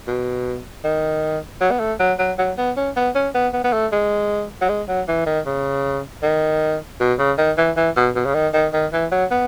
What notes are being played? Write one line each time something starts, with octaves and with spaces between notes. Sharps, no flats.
B2
D#3
F#3
B3
A3
F#3
F#3
F#3
B3
C#4
B3
C#4
B3
B3
B3
A3
G#3
F#3
G#3
F#3
E3
D#3
C#3
D#3
B2
C#3
D#3
E3
E3
B2
B2
C#3
D#3
D#3
D#3
E3
F#3
B3